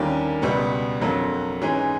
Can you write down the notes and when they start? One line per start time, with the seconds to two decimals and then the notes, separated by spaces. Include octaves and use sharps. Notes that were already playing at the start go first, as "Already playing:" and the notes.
Already playing: D#2 D3 G3 A#3 C#4 F4
0.42 C#2 B2 G3 B3
1.01 F2 D3 F#3 A#3
1.62 G#2 E3 G#3 C#4 G#4